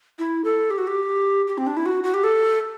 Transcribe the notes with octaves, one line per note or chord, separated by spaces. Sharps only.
E4
A4
G4
F#4
G4
G4
C4
D4
E4
F#4
F#4
G4
A4